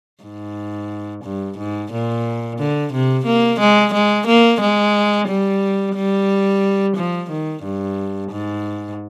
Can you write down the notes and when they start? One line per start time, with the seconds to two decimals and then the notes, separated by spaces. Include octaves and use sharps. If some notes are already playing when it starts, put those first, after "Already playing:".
0.24 G#2
1.24 G2
1.58 G#2
1.92 A#2
2.59 D3
2.93 C3
3.26 A#3
3.60 G#3
3.94 G#3
4.28 A#3
4.61 G#3
5.28 G3
5.96 G3
6.97 F3
7.30 D#3
7.64 G2
8.31 G#2